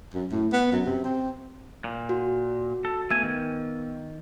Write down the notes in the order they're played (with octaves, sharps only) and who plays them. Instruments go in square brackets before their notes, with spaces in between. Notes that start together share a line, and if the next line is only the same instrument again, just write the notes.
[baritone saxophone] F#2
A2
B3
F#2
C3
C4
[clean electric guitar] A#2
[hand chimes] F#4
[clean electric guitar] A4
[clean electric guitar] A3 G#5 [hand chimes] B3 E6
[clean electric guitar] D#3